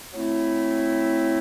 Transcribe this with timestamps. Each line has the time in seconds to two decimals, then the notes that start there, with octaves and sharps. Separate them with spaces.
0.13 F#3 A3 C4 E4